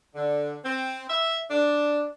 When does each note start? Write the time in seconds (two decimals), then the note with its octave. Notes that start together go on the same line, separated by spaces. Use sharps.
0.15 D3
0.64 C4
1.09 E5
1.50 D4